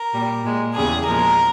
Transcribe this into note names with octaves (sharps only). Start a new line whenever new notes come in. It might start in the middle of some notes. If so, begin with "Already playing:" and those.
Already playing: A#4
A#2 G3
A#2 G#3
E2 C#3 G3 G#4
A#2 F3 G#3 A#4